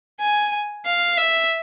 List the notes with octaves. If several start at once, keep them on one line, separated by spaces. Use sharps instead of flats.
G#5
F5
E5